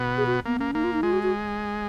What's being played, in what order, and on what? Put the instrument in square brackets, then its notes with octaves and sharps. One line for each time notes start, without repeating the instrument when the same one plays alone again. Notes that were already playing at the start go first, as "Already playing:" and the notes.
Already playing: [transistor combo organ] B2 B3
[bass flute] G#4
F#4
[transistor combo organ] A#3 [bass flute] B3
[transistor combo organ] A#3 [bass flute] C#4
[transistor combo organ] A#3 [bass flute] D#4
[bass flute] F4
D#4
[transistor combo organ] G#3 [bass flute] F4
[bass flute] F#4
F#4